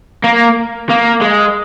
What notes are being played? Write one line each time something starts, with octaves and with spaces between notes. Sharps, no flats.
A#3
A#3
G#3